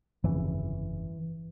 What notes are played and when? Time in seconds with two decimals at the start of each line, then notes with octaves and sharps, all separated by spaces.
0.24 G1 F2 C#3 E3